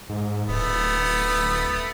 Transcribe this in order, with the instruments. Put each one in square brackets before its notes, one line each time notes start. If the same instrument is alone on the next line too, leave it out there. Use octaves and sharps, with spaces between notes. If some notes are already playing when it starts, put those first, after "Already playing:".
[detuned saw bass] G#2
[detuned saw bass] D1 [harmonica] A3 B3